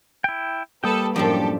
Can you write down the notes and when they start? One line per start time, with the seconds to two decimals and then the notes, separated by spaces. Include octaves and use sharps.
0.24 E4 G5
0.84 G3 A#3 G4 A4 B4 D#6
1.16 F#2 A2 F3 D4 G4 A4